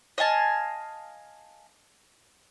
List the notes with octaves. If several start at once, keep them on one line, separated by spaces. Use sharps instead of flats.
D#5 F5 G#5 A5